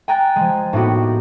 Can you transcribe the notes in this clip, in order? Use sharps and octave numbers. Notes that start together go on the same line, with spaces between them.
G5 G#5 A#5 F#6 A6
F3 G#3
A2 A#3 B3 D#4 F#4 G4